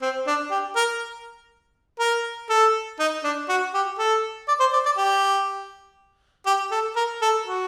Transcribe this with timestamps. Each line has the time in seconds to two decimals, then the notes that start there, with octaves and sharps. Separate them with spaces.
0.02 C4
0.27 D4
0.51 G4
0.76 A#4
1.99 A#4
2.49 A4
2.99 D#4
3.24 D4
3.49 F#4
3.74 G4
3.99 A4
4.48 D5
4.60 C5
4.73 D5
4.85 D5
4.97 G4
6.46 G4
6.71 A4
6.96 A#4
7.21 A4
7.46 F#4